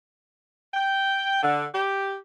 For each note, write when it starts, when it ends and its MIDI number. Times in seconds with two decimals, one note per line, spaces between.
0.74 1.42 79
1.42 1.65 50
1.75 2.17 67